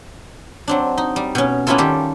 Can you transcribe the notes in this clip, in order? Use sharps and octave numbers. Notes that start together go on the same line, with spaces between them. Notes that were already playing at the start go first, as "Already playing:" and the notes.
F#3 C4 D4
D#4
G3
B2 C#4
A#3 B3 C#4 E4 F4 A4
D#3 G3 G4 A4